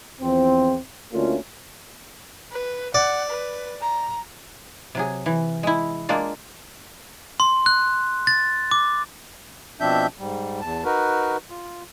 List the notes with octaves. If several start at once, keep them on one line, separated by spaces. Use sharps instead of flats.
E2 F3 C4
D2 D3 A3 A#3 C#4 F4
B4
D5 F#5
B4
A#5
C3 F#3 G#4
E3
G#3 E4
G#3 A#3 D4 F4
C6
F#6
A6
D6
B2 F3 C4 D4 E5 G6
G#2 G3
E2 A5
D#4 F#4 A#4 B4
F4